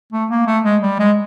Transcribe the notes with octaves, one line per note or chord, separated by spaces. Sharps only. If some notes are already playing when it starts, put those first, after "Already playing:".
A3
A#3
A3
G#3
G3
G#3